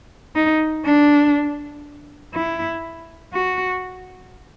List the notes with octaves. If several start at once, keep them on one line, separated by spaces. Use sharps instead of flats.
D#4
D4
E4
F#4